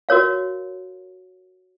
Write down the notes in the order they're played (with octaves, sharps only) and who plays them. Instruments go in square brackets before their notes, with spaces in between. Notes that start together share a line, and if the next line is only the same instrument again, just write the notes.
[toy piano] F#4 A#4 C#5 F5